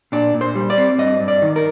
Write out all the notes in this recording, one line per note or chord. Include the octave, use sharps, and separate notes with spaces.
A#2 D4
A#2
C5
G3
D5
C4
G2 D#5
G2
D5
D#3
A#4